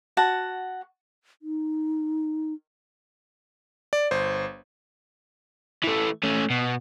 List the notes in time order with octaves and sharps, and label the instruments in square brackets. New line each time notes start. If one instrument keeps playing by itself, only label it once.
[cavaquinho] F#4 F#5 A5
[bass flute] D#4
[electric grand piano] D5
G1 C5
[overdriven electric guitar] E3 A3
A3 C#4
B2